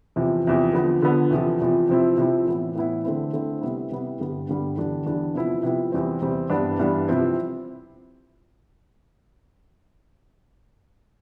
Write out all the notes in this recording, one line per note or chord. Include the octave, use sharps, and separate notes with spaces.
E2 C3 F3
E2 C3 F3
D3 F3 B3
D3 F3 B3
E2 C3 F3
E2 C3 F3
C3 F3 C4 E4
C3 F3 C4 E4
A2 E3 B3 E4
A2 E3 B3 E4
D3 A3 C4 E4
D3 A3 C4 E4
C3 G3 B3 E4
C3 G3 B3 E4
G2 D3 G3 B3
G2 D3 G3 B3
E2 D3 G3 D4
E2 D3 G3 D4
C3 F3 B3 E4
C3 F3 B3 E4
E2 C3 G3 C4
E2 C3 G3 C4
G2 E3 G3 B3 D4
G2 E3 G3 B3 D4
C3 F3 C4 E4